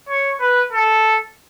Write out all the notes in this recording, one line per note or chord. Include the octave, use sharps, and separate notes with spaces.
C#5
B4
A4